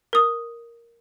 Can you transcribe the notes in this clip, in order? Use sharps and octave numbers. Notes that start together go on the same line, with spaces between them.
A#4 D#6